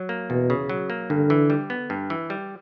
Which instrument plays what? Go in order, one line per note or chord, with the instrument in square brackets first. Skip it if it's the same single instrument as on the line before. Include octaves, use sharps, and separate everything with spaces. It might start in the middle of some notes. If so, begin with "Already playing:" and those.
Already playing: [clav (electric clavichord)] F#3
A#3
[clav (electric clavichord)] E2 [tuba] B2
[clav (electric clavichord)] C#3
F#3
A#3
[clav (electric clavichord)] G2 [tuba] D3
[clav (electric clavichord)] E3
G3
B3
G2
E3
G3